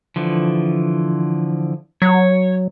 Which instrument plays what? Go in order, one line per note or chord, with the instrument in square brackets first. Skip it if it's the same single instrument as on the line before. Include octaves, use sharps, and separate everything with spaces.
[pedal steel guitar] D3 E3 F3
[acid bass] F#3 [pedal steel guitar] C#5